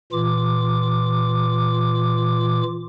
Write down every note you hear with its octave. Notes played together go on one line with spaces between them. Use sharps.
A#2 E3 F4 D6